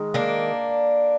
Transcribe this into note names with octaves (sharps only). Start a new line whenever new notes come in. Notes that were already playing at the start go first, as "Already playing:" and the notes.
Already playing: D#3 G#3
A#3 D4